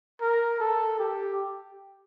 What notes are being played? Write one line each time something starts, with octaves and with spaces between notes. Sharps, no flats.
A#4
A4
G4